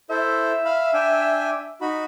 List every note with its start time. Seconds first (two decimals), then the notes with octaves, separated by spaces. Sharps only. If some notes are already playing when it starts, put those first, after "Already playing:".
0.10 E4 A4 C5 E5
0.65 F5 B5
0.94 D4 G5 G#5
1.81 D#4 F#4 B5